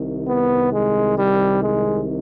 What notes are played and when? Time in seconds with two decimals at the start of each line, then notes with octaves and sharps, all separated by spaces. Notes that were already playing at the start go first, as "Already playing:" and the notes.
Already playing: C2 C3 D#3
0.27 B3
0.73 G#3
1.18 G3
1.63 G#3